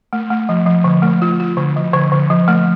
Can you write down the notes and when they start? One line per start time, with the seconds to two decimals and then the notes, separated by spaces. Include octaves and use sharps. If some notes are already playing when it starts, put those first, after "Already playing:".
0.13 A3
0.31 A3
0.49 F3
0.66 F3
0.84 D3
1.02 A3
1.22 F4
1.40 F4
1.57 D3
1.76 F3
1.93 D3
2.12 D3
2.30 F3
2.48 A3